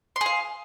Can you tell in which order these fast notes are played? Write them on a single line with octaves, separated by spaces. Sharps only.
C6 G#4 F5